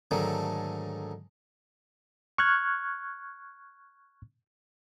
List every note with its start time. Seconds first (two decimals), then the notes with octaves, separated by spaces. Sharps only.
0.11 G#2 D3 D#3 F#3 G#3 A3
2.38 C#6 F6 F#6 G#6